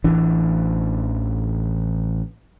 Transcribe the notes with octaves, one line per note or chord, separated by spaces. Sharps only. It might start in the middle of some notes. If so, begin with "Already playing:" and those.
A1 E3 D4